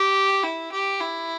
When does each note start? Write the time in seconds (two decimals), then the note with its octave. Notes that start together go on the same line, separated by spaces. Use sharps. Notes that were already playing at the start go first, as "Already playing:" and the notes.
Already playing: G4
0.43 E4
0.72 G4
1.01 E4